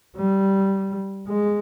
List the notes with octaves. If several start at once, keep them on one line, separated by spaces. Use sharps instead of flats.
G3
G#3